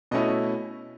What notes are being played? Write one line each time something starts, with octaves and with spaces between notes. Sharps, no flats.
B2 A3 C#4 E4 D#5